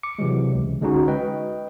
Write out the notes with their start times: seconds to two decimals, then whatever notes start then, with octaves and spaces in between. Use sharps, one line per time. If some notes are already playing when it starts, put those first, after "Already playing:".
0.03 D6 C#7
0.19 C3 E3 F#3 G#3
0.55 C#2
0.81 D3 G#3 C#4 D#4 F#4
1.08 B4 D#5 G5